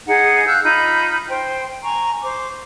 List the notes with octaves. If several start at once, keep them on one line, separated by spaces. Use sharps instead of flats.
D#4 G#4 F#5
F5 E6 F#6 G6
D#4 F4 B5 G6
C5 G5
G#5 A#5 C#6
C5 D6